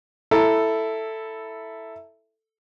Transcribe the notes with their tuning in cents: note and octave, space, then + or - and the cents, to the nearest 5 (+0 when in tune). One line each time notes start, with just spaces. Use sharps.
E4 +0 A4 +5 A#5 +0